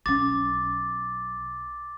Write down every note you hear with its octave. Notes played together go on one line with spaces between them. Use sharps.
B1 C#4 D6 A6